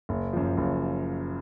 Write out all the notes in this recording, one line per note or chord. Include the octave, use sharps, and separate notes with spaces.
F#1
F#2 F3
F#1